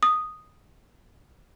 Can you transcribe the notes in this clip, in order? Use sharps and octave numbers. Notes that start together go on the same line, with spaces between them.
D#6